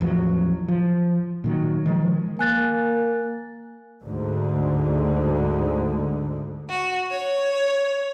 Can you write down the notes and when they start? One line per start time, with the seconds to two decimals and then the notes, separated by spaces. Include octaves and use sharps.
0.01 A1 E2 F3 F#3
0.68 F3
1.44 A#2 D#3 F#3
1.86 D#3 F3 G#3
2.39 A#3 G#5 F#6 A6
4.03 D2 G#2 D3
6.69 F#4
7.11 C#5